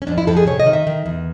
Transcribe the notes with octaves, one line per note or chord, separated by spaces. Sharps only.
C#4
F2 D4
E4
F2 A4
G#4
C3 C#5
D#5
D#3
E5
D#3
E2